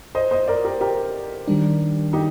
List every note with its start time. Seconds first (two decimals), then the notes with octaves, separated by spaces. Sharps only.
0.15 C5 D#5
0.31 C5 D#5
0.48 A#4 D5
0.65 G4 A#4
0.81 G4 A#4
1.48 D#3 G3 D4
2.13 D#4 G4